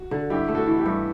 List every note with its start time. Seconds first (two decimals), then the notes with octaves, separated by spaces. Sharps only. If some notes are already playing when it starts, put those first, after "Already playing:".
Already playing: F#4
0.11 D3
0.30 G2 E4 G4
0.48 A3
0.55 F#4 A4
0.67 E3
0.79 E4 G4
0.86 G2